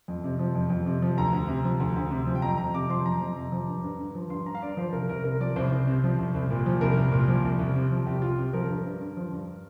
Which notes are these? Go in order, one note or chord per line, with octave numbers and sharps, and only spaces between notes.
F2
C3
F3
F2
F2
C3
F3
D2 A#5
D2
C3
F3
D2
D2
C3
F3
G5
F2 A#5
F2 A#5
C3 D6
F3 C6
F2 A#5
F2
C3
F3
G2
G2
D3
F3
G2 C6
G2 A#5
F5
D3 D5
F3 C5
C2 A#4
C2 A#4
C3 A#4
F3 D5
C2 C5
C2
C3
F3
C2
C2
A#2
F3
C2 A#4
C2
A#2
F3
C2
C2
C3
F3
C2 G4
C2 F4
C3 G4
F3 A#4
G2 A#4
G2
D3
F3
G2